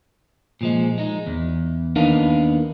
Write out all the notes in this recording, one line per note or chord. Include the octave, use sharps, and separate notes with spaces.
A#2 F3 G#3
G#3 D#4
E2
D#2 B3 D4 D#4 A#4 F5